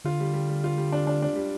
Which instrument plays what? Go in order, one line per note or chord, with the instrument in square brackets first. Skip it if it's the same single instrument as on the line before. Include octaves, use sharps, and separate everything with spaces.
[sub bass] D3 [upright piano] F4
[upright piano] G3
G3
G3
F4
G3
D4
D4
D4
G3